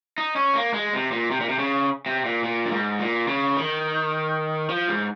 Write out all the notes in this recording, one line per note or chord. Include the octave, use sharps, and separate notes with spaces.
D#4
C#4
A#3
G#3
C3
A#2
C3
A#2
C3
C#3
C3
A#2
A#2
G2
G#2
A#2
C#3
D#3
F3
G#2